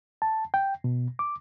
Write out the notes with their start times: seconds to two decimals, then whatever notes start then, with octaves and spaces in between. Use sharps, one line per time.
0.22 A5
0.54 G5
0.84 B2
1.19 D6